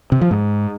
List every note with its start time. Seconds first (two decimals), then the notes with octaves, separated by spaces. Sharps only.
0.12 C3
0.21 F3
0.31 G#2